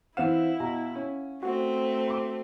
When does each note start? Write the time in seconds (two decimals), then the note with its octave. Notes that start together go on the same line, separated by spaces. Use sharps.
0.17 E3 C4 E4 F5 F#5 E7
0.60 B2 A#5
0.96 C#4
1.43 A3 C4 F#4
2.08 C6 D6